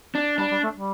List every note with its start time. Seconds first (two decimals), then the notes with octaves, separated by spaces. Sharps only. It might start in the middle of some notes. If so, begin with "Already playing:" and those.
0.15 D4
0.38 G3 D4
0.51 G3
0.63 A3
0.75 G3